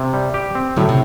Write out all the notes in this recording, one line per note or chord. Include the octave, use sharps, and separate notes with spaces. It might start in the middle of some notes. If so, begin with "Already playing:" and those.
Already playing: C3
G3
G4
C4
A2 D3 F#3
C3